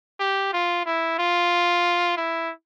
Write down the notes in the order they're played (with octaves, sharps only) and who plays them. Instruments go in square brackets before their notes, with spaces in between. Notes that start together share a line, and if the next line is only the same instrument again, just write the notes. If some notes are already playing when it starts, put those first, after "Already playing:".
[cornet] G4
F4
E4
F4
E4